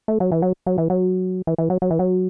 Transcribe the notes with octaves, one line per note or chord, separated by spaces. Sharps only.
A3
F#3
E3
F#3
F#3
E3
F#3
E3
E3
F#3
F#3
E3
F#3